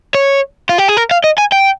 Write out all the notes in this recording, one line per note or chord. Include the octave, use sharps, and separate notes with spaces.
C#5
F4
G4
G#4
A#4
F5
D#5
G#5
G5